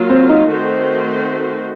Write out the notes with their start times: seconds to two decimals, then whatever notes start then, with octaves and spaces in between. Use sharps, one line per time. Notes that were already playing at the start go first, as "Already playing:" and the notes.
Already playing: F#3 A#3 F4
0.10 C4
0.29 D#4
0.48 D#3 A3 C4 F#4 C5